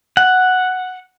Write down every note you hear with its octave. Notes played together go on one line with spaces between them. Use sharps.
F#5